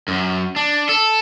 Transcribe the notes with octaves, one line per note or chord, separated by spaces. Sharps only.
F#2
D4
A4